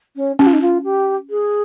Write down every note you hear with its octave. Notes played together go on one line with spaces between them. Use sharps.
C#4
C#4 G4
F4
D#4
F4
G4
G#4